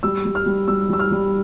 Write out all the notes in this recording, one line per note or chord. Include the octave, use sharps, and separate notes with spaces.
G3 E6
G3
F6
G3
G3 E6
G3 E6
F6
G3